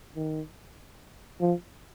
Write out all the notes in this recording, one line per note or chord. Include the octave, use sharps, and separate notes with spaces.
D#3
F3